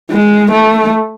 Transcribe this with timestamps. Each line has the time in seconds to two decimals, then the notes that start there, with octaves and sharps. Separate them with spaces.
0.11 G#3
0.51 A3